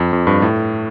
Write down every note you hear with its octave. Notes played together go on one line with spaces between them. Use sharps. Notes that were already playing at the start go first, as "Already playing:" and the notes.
Already playing: F2
F2
G2
A2